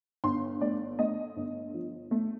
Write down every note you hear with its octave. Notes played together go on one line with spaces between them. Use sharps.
G1 C6
A3 D5
A3 D#5
G1
F3
A3